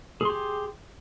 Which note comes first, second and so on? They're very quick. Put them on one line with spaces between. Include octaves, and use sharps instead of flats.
G#4 C6 G4